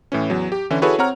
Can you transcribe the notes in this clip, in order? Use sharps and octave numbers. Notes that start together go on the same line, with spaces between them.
A2 E3 C#4
E2 F#3
G4
D3 E3 C#4 E4
E4 F#4 G#4 A4 B4 C#5
C4 C#5 F#5 A#5 F6